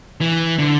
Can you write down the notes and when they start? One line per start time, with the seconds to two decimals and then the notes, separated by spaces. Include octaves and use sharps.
0.21 E3
0.59 D3